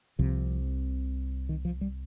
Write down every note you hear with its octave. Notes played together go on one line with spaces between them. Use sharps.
C2 C3 F3
D#3
F3
G3